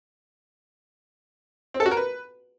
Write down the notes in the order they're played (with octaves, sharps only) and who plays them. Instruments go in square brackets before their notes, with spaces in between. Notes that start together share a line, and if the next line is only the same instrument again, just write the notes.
[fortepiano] C4
A4
F#4
A#4
B4